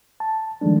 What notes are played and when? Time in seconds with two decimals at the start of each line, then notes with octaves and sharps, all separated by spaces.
0.20 A5
0.61 D#3 F3 G#3 A3 D4